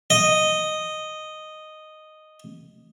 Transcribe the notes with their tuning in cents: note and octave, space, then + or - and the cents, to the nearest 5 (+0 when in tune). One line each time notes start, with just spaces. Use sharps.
D#5 -5